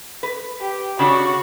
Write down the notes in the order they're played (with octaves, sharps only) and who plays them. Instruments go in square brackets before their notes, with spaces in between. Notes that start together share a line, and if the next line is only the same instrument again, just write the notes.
[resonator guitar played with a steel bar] B4
[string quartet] G4
[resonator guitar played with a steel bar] C#3 D4 C#5 [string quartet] F#4